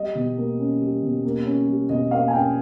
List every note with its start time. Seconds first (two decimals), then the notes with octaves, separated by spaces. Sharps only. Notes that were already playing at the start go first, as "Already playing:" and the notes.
Already playing: G3 D#5
0.15 B2
0.37 A#3
0.59 C#4
0.81 G3
1.02 B2
1.25 A#3
1.45 C#4
1.68 G3
1.89 B2 D#5
2.11 A#3 F5
2.28 G#5
2.33 C#4 G5